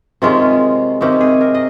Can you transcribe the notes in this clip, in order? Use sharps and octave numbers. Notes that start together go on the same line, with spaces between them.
C3 D#3 G#3 C#4 F4
C3 D#3 G#3 C#4 G4
G#4
A#4
D#5